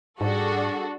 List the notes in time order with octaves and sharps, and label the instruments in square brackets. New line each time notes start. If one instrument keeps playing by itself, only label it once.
[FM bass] G#2 [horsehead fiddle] G3 G#4 [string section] D4 F#4 A4